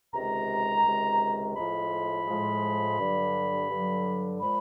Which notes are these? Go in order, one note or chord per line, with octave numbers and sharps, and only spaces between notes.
C#2 C3 D#3 G#3 A#5
C#2 C3 D#3 G#3
A2 F3 G#3 B5
A2 F3 G#3
G2 D3 F#3
G2 D3 F#3
A#2 F3 G#3 B5